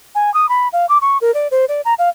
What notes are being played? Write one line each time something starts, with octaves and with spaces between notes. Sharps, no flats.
G#5
D#6
B5
F5
D6
C#6
A#4
D5
C5
D5
A#5
F5